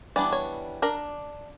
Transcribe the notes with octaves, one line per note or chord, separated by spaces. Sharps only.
E3 G3 B3 D4 D5
C#5
D4 A#4